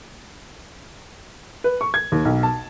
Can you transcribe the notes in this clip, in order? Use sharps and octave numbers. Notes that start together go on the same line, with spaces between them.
B4
C#6
G#6
D#2
B1
A5